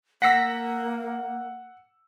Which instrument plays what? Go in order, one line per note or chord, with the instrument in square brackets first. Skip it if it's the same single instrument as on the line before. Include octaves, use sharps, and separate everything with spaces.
[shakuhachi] A#3 [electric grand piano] F#5 E6 [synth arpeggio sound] A#6 B6